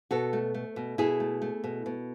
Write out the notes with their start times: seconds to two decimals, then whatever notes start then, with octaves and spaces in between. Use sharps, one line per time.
0.11 B2 F#4 A4
0.33 A3
0.54 A3
0.76 B2
0.98 B2 E4 G#4
1.20 A3
1.42 A3
1.64 B2
1.86 B2